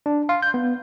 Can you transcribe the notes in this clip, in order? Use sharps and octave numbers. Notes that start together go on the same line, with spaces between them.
D4
F5 C6
G6
B3